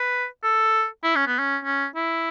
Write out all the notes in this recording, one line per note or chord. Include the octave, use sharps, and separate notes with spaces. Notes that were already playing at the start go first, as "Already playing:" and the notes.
Already playing: B4
A4
E4
C#4
B3
C#4
C#4
E4